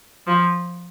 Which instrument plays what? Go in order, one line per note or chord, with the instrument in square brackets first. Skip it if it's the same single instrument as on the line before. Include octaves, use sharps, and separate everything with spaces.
[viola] F3